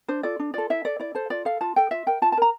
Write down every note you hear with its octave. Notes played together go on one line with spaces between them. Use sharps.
D4 C5
F4 A4 D5
D4
F4 A4 D5
E4 E5
A4 D5
E4 D5
A4 C5
F4 D5
A4 F5
F4 A5
A4 G5
F4 E5
A#4 G5
F4 A5
A5
A#4 A#5